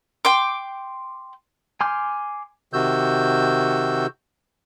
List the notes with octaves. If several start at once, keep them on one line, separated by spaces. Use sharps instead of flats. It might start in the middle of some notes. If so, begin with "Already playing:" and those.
G5 C6 D6
G#5 C6 D6 F6 G6
C3 D#3 F#4 E6 G6